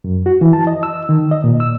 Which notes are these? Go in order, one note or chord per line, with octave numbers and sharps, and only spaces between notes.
F#2
F#4
E3
A5
D#5
E6
D#3
D#5
A#2
E6